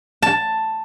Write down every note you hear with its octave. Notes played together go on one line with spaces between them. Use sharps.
A5